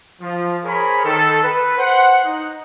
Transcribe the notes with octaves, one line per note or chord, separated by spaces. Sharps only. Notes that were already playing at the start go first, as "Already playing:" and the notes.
F3
G#4 A#4 C5 C#5 B5
D#3 A4
B4
C5 F#5
D#4